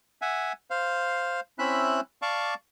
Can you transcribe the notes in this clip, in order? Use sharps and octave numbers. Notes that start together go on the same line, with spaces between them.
E5 F#5 G#5
C5 F5
C4 C#4 E4 E5 B5 F#6
D5 F5 A5 C#6 D6